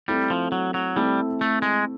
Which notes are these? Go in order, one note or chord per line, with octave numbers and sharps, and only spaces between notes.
G3 A3 C4 E4 A4
F3
F#3
F#3
G3 A3 C4 E4 A4
A3
G#3